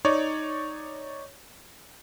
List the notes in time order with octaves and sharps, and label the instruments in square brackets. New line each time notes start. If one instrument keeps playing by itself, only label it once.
[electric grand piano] D#4 C#5 D5